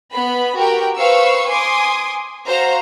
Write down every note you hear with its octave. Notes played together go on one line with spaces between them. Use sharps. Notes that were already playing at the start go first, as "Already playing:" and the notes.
B3 B5
F#4 G4 A#4 G5
B4 C5 F5 C#6 E6
G#5 C6 D6 D#6
F#4 C5 F5 A#5